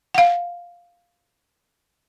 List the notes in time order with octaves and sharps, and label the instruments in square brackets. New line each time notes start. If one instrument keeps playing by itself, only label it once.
[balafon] F5 F#5